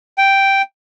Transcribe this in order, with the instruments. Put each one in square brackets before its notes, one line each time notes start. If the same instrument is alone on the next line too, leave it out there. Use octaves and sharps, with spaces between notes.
[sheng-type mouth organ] G5